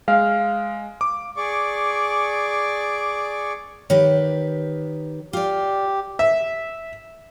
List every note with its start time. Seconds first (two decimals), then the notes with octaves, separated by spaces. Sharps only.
0.08 G#3 F5
1.01 D6
1.37 G#4 D5 C#6 D6
3.90 D#3 G4 B4 C#5
5.33 F4 G4 D5
6.19 E5